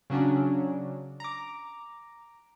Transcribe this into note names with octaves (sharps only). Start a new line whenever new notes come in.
C#3 F#3 C#4 D4
A#5 D6